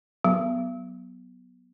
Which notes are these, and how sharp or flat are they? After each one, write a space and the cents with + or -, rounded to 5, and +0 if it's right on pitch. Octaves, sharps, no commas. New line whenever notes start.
F#3 +0 B3 -5